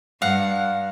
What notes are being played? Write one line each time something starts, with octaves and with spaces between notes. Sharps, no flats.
G2 F5 F#5